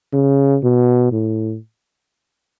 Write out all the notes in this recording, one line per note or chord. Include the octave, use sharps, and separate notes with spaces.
C#3
B2
A2